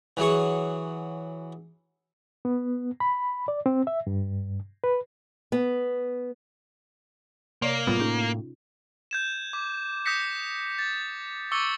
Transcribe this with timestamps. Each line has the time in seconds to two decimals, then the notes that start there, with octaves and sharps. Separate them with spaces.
0.17 E3 F#3 G#4 C#6
2.45 B3
3.00 B5
3.48 D5
3.66 C4
3.87 E5
4.07 G2
4.84 B4
5.52 B3
7.62 C3 A#3 C#5 D5
7.87 A2 G3 B3 F4
7.99 A2 C#4 D#4 G#4
9.11 G6 G#6 E7
9.53 D6
10.05 D#6 G6 A#6 B6 C#7
10.79 A6
11.52 C#6 D6 E6 A6 C#7 G7